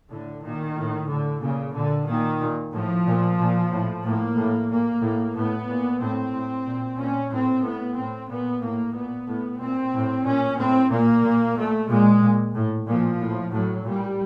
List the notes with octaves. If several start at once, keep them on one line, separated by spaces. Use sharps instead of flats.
A2 D3
A#2 D#3
A2
A2 D3
A#2 C#3
A#2 D3
A#2 D#3
A#2
A2 F3
A#2
A#2
A2
A2 A#3
A2
A#2 A#3
A2
A2 B3
A#2
A2 C4
A2
A#2
A#2 C#4
A2 C4
A2 B3
A2 C4
A#2 B3
A2 A#3
A#2 B3
A2
A#2 C4
A2
A#2 C#4
A2 C4
A#2 A#3
A#2
A#2 A3
A#2 G#3
A#2
A2
A#2 F3
A2
A2 F#3
A#2 G3